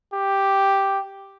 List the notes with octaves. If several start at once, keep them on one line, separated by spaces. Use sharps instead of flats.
G4